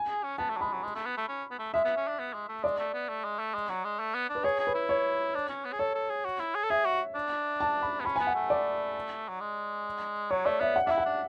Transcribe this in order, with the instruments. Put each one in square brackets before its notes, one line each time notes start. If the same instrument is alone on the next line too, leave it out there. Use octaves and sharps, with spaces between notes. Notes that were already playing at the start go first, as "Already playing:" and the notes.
Already playing: [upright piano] G#5
[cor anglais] G#4
C#4
[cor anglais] B3 [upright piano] A5
[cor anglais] A3
F#3
[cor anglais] G#3 [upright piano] B5
[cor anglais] F#3
G#3
A3
B3
A3
C#4
B3
A3
[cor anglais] G#3 [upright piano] E5
[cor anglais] B3
C#4
D4
B3
G#3
A3
[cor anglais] G#3 [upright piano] D5
[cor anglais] A3
B3
A3
G#3
A3
G#3
F#3
G#3
A3
B3
D4
[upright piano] B4
[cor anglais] G#4 [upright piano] C#5
[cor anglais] G#4
[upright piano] B4
[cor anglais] E4
[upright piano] C#5
[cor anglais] D4
C#4
B3
G#4
[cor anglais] A4 [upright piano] C#5
[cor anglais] A4
G#4
F#4
E4
G#4
A4
[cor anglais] G#4 [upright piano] E5
[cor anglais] F#4
D4
[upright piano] A5
B5
[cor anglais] B3
[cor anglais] C#4 [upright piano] B5
[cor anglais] B3 [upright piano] G#5
[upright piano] F#5
[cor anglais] A3
[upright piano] D5
[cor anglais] F#3
G#3
[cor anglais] F#3 [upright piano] C#5
[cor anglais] A3 [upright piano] D5
[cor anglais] B3 [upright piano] E5
[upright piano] F#5
[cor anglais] D4 E4 [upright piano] E5
[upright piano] F#5
[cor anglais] D4